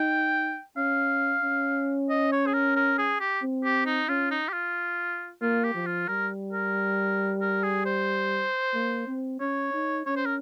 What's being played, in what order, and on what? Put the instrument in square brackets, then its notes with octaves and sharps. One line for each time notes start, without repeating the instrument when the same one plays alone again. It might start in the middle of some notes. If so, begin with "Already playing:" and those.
Already playing: [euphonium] D#4 [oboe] G5
[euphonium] C#4 [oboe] F5
[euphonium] C#4
[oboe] D#5
C#5
G#4
A#4
A#4
G#4
G4
[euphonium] C4
[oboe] G4
D#4
[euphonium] C#4 [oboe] F4
[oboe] D#4
G4
F4
[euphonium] A#3 [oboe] F4
[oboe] G4
[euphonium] F3
[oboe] F4
[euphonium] G3 [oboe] A#4
[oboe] A#4
A#4
G#4
C5
[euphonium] A#3
C4
[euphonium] C#4 [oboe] C#5
[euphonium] D#4
[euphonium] C#4 [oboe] C#5
[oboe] C5
A#4